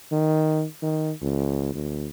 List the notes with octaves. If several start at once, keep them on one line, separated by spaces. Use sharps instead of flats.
D#3
D#3
C#2
D2